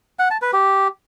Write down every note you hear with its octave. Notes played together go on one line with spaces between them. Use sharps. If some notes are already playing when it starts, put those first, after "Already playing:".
F#5
A5
B4
G4